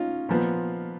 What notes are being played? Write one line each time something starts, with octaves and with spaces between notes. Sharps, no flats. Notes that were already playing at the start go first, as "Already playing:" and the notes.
Already playing: C#4 D#4 F4
A#2 F3 B3